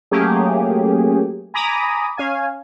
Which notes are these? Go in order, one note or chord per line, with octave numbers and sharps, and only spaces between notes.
F#3 A3 A#3 C#4 G4 G#4
G#5 A#5 B5 D6 D#6
C#4 F5 G#5